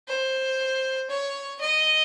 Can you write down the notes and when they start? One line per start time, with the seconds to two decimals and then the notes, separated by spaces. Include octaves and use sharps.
0.08 C5
1.10 C#5
1.61 D#5